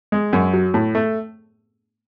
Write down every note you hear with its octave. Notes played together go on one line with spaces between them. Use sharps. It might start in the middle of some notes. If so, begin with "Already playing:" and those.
G#3
F#2
F#3
A2
A3